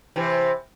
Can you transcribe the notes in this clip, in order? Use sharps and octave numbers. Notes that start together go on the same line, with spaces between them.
C3 E3